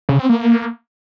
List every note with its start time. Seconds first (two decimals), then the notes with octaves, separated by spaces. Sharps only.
0.09 C#3
0.19 C4
0.29 A#3